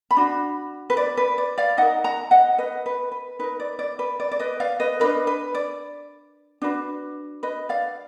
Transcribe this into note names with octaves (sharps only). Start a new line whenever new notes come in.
B5
D4 F#4
B4
D5
B4
D5
D5 F5
D#4 A#4 D#5 F#5
F#5 A#5
D#5 F#5
B4 D#5
B4
B4
D#4 A#4 B4
D5
D5
B4
D5
D5
B4 D#5
D5 F5
B4 D#5
D4 F#4 A#4 B4 D#5
B4
D5
D4 F#4 B4
B4 D#5
D5 F5